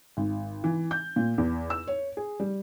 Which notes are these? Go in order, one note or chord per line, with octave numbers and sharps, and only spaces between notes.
G#1
E3
G6
A#2
E2
E6
C#5
G#4
G3